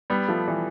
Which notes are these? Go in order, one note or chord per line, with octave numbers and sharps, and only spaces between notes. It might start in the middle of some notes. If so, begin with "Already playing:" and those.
G3 B3
F3 A3
E3 G3